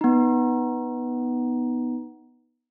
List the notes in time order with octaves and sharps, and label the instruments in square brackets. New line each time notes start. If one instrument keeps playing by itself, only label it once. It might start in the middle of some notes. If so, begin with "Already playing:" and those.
[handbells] B3 D#4